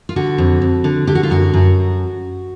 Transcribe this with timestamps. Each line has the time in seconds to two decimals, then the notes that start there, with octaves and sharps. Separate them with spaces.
0.09 F4
0.16 D3 F#4
0.38 F2
0.62 F2
0.84 D3
1.07 D3 G4
1.15 F#4
1.23 F4
1.30 F#2 F#4
1.54 F#2